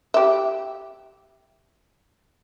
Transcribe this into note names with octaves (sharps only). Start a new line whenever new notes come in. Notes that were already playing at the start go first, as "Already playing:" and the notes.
G4 E5